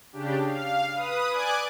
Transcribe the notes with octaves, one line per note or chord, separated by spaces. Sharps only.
C#3 D4 G4
F5
B4 D#6
D5 G#5 D6 F#6 G#6